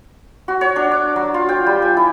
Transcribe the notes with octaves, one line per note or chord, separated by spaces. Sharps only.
F#4
C#5
D4
D6
F#3
F4
G5
G3
G#5
E4